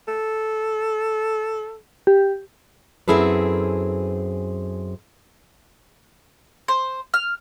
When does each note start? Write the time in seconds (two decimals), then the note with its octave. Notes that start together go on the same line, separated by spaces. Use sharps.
0.08 A4
2.07 G4
3.08 F#2 C4 E4 G#4 A4 B4
6.68 C5
7.14 F6